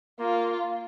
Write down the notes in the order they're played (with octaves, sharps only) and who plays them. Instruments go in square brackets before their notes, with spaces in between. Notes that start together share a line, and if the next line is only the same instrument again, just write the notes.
[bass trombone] A#3 [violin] F4